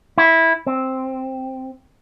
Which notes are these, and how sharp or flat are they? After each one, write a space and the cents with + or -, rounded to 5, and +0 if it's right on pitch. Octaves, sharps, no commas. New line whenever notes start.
E4 -10
C4 +0